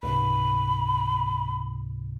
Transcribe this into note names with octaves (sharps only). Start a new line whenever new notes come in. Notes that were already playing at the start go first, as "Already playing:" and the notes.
C#2 G#2 C3 B5